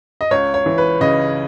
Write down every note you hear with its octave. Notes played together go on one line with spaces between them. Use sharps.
D#5
C#2 C#5
C#5
E3
B4
C#3 D#5